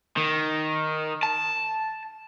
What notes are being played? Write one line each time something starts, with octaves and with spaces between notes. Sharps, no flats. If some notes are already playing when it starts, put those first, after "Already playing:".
D#3
A5